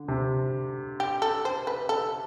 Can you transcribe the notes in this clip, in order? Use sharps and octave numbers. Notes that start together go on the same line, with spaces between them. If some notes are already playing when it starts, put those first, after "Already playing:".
Already playing: D3
C3
G4
A4
C5
B4
A4